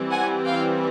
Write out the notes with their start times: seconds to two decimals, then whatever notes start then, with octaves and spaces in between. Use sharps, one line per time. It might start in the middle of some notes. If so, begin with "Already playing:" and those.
Already playing: E3 G3 C4
0.10 F#5 G#5
0.45 F5 G5